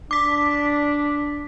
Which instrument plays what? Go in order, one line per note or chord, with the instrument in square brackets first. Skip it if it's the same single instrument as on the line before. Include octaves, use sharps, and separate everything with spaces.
[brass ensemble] D4 [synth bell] D6 B6